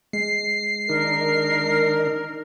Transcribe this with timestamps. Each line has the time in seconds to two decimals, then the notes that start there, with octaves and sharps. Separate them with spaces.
0.13 G#3 C7
0.89 D#3 D4 D#4 A#4